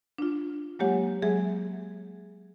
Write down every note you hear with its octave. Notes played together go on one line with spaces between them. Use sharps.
D4 F4
F#3 G#3 A#3 G4 C#5 F#5
F#3 G#3 G#4 E5